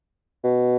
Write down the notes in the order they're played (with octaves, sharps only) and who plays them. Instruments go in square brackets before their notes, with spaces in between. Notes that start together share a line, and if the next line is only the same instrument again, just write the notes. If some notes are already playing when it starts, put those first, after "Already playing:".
[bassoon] B2